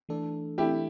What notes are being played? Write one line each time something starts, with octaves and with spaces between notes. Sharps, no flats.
E3 A3 D4 A4
E3 A3 D4 E4 G4 A4